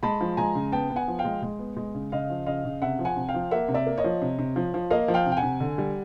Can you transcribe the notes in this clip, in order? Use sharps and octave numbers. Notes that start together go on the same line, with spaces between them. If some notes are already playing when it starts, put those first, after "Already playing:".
G#3 A5 B5
F3
G#3 G#5 A#5
C#3
B3 G5 A5
B3
F#5 G#5
F3
F5 G5
G#3
G#3
B3
G#3
C#3
C#3 D#5 F5
F3
C#3 D#5 F5
C#3
C3 E5 F#5
F3
F#5 G#5
C3
F5 G5
F3
A#3 E5 F#5
C3
D5 E5
A#3
C#5 D#5
F3
C3
C3
F3
F3
A#3 D#5 F5
F3
F5 G5
C3
G5
F#5 G#5
C3
D3
G3